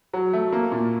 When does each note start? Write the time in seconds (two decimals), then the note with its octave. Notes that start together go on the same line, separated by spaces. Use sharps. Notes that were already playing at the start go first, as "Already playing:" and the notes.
0.13 F#3
0.33 A3
0.52 A#3
0.72 A#2